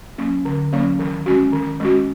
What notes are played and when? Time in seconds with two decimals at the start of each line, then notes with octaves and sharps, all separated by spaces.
0.18 F#3 A#3 C#4
0.45 D3
0.73 F#3 A#3 C#4
0.99 D#3
1.26 G#3 C#4 F#4
1.53 D#3
1.80 G#3 C#4 F#4